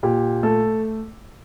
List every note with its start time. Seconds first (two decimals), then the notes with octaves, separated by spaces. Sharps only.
0.03 A#2 G4
0.43 A3 A4